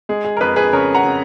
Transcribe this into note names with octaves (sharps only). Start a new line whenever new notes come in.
G#3 G#4
G#4
A#4
F2 G#4 B4
G#4 B4
C#3 A#4 C#5
F#5 A#5
C#3